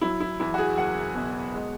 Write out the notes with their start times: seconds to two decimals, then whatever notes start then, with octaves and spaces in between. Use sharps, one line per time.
0.01 F#3 E4
0.20 E4
0.40 E2 E4
0.54 F#4
0.58 G#4
0.78 F#1 F#5
1.15 B2
1.54 G#3